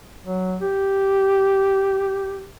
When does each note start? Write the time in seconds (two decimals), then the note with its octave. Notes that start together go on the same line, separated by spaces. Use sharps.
0.23 F#3
0.62 G4